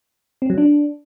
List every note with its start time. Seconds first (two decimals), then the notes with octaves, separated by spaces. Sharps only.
0.42 C4
0.50 F#3
0.58 D4